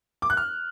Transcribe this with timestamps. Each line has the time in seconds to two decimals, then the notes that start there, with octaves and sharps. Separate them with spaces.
0.22 D6
0.30 F#6
0.37 F6